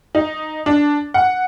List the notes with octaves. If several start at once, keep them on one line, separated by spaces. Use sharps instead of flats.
D#4
D4
F#5